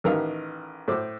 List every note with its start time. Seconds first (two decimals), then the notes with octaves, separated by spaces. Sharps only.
0.04 A1 D#3 B3 A#4 F5
0.88 A2 C5 D6